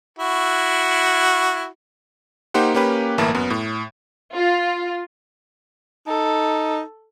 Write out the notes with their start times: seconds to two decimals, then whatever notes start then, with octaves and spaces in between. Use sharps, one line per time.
0.19 E4 F#4
2.54 A#3 D#4 G4 C5 F#5
2.74 A#3 C#4 G4 B4
3.18 G1 A2 E3 A#3 E4 A5
3.35 F#2 B3
3.50 A2
4.35 F4
6.07 D#4 A4